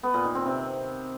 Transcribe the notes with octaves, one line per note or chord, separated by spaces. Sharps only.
B3
A#2
D#3
C4
C3